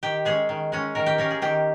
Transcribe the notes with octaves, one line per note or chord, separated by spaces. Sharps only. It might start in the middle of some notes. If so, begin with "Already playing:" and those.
D#3 G4
G#3 C#4 G#4
D#3
G#3 C#4
D#3 A#4
G4
A#3 C#4 A#4
G#4
D#3 G4